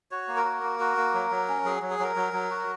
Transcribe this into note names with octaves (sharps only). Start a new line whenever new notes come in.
F#4 C#5
A#3
A#4
F#4
A#3
F#4
A#3
F#3
F#3
C#4
F#3 G#4
F#3
G#4
F#3 A#4
F#3
F#3
F#4